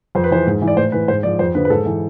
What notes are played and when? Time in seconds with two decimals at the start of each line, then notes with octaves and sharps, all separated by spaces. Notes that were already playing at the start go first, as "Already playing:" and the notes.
0.15 F2 C5
0.24 B4
0.31 E3 C5
0.46 G#2
0.62 E3
0.68 D5
0.77 A2 C5
0.92 E3 B4
1.08 G#2 C5
1.23 F3 D5
1.39 F2 C5
1.55 D3 F3 B4
1.65 B4
1.70 G#2 A4
1.85 E3